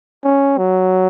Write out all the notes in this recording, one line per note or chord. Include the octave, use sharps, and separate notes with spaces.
C#4
F#3